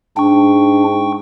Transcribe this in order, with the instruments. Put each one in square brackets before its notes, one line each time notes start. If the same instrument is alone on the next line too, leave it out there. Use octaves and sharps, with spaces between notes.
[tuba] G#2 [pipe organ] D4 [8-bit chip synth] G5 C#6